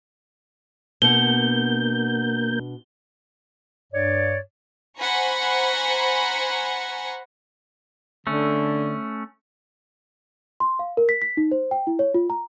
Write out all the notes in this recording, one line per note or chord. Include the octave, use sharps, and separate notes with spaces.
B2 A#3 D4 F#5 G6 G7
G2 C#5 D5
C5 F#5 G#5 A#5 B5 C#6
D3 A3 C#4
C6
F5
A#4
B6
B6
D#4
C5
G5
E4
C#5
F4
A#5